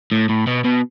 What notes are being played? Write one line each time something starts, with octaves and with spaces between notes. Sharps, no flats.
A2
A2
B2
B2